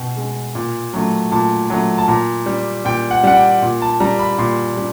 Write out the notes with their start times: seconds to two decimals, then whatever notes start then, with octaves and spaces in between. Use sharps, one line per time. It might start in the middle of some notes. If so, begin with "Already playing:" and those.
Already playing: B2 G5
0.17 G#3
0.55 A#2
0.93 F#3 A3
1.32 A#2 A5
1.70 F#3 A3
1.98 A5
2.08 A#2 A#5
2.46 G3
2.85 A#2 G5
3.11 F#5
3.24 G3 F#5
3.36 G5
3.62 A#2
3.82 A5
4.00 G3 A#5
4.19 B5
4.38 A#2 C6
4.77 G3